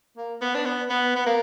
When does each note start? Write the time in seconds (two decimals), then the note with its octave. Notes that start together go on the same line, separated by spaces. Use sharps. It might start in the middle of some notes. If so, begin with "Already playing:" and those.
0.17 A#3
0.41 B3
0.55 D4
0.65 B3
0.90 B3
1.16 B3
1.26 A#3